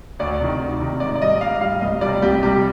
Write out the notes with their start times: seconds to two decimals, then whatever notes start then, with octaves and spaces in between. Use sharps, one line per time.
0.19 D2 D5
0.40 C3 D#3
0.61 D2
0.80 C3 D#3
1.00 G#2 D5
1.15 D5
1.21 G3 D#5
1.41 G#2 F5
1.61 G3 F5
1.81 C2 D#5
2.01 C3 G3 D5
2.22 C2 G4
2.43 C3 G3 G4